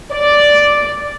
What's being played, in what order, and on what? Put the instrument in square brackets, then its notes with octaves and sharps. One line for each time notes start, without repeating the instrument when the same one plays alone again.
[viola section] D5